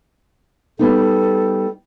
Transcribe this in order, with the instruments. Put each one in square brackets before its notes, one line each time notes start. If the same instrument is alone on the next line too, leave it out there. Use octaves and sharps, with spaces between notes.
[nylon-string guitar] G3 B3 D#4 [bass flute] A4